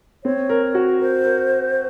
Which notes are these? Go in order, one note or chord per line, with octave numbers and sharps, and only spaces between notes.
C4 C#5
A#4
F#4
A#4 C5
A#4